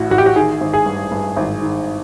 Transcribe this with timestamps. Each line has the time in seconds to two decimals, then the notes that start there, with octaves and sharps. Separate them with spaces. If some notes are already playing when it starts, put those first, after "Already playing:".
Already playing: A1 A2 F#4
0.11 A1 F#4
0.18 G4
0.26 F#4
0.35 D#3 G#4
0.61 G#1
0.73 G#4
0.86 G2
1.12 G2
1.36 G#1
1.62 D#3